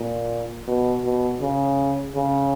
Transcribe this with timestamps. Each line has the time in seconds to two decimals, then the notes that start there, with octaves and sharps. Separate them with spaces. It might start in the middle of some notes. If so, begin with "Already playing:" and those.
Already playing: A#2
0.67 B2
1.03 B2
1.41 C#3
2.15 C#3